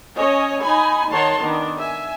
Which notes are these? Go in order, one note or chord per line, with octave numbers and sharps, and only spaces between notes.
C#4 C#5 D#5 G#5
D#4 G#5 B5
D#3 C#5 F#5 A5 C6
D#3 B3 D4
E5 G#5